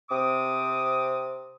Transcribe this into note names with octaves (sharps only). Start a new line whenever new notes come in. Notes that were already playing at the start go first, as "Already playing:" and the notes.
C3 C4 D6 D#6